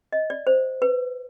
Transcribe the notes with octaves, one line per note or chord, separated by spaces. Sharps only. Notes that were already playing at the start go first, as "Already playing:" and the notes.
D#5
D5
C5
B4